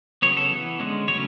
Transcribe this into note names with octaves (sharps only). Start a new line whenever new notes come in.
C#3 F#3 B3 C#5
A4
E3 B3
D3 G#3 C#4
C#3 F#3 A3 C#4 C#5